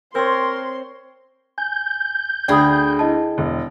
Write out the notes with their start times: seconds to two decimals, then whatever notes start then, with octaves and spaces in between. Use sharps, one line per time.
0.15 C4 A#4 C#5 C6
1.58 G#5 G6
2.48 D2 G#4 D5 G5 B5 D#6
2.99 E4 D#5 A5
3.38 E1